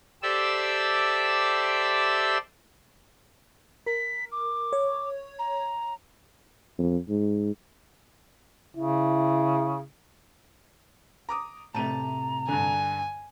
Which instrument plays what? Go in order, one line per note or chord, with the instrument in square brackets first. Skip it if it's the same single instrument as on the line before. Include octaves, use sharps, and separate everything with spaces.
[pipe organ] G4 A4 C5 D5 E5 E6
[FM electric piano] A#4 [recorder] B6
[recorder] D6
[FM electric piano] C#5
[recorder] A#5
[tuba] F2
G#2
[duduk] C#3 [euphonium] E4
[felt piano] A#5 D6 D#6
[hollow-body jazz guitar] A2 C3 A3 [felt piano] A5 D#7 [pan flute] A#5
[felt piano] G2 D3 [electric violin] G#5